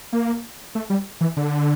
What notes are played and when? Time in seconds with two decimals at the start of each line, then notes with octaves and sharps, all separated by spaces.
0.13 A#3
0.75 A3
0.90 G3
1.21 E3
1.37 D3